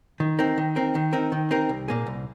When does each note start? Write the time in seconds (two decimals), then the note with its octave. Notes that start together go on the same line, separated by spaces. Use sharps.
0.20 D#3
0.39 C4 D#4 A#4
0.58 D#3
0.76 C4 D#4 A#4
0.95 D#3
1.13 C4 D#4 A#4
1.32 D#3
1.51 C4 D#4 A#4
1.69 C2
1.88 A#2 A#3 G#4
2.07 C2